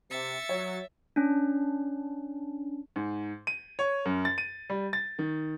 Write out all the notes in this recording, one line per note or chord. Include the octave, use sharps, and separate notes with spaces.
C3 E5 A6 C#7
F#3 C#5
C#4 D4
G#2
D#7
C#5
F#2
A6
D#7
G3
A6
D#3